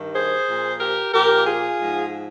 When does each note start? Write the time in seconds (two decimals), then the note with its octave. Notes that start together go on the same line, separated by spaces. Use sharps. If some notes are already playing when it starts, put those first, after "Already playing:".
Already playing: G2 D#3
0.14 G#4 C5
0.47 A#2 F3
0.81 G4 A#4
1.13 A#2 F3 G4 A#4
1.47 F4 G#4
1.80 G#2 F3